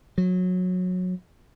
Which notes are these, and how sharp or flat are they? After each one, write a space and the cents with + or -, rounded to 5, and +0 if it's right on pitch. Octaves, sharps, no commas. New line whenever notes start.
F#3 -20